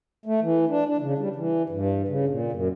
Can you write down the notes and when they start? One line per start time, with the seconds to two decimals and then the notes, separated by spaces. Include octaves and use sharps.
0.26 A3
0.42 E3
0.68 D4
0.86 D4
1.01 C#3
1.18 G3
1.36 E3
1.69 G2
2.08 C#3
2.29 A#2
2.52 F#2